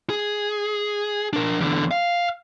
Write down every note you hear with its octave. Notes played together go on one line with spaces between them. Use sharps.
G#4
D4 A#4
E2 D3
F5